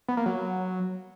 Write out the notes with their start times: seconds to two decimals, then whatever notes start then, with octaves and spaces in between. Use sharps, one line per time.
0.08 B3
0.17 A#3
0.26 F#3